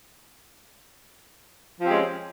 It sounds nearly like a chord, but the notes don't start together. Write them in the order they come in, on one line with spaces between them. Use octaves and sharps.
F3 C4 G4 G#3 C#4